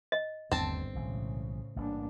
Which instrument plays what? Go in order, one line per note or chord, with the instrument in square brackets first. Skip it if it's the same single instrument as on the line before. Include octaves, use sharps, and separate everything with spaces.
[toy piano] D#5
[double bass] G1 [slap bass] D#2 D3 A3 [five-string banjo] C4 A5
[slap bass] B1 E3 G#3 [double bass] A2 C#3
[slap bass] A1 G#2 G3 [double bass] A#3 D4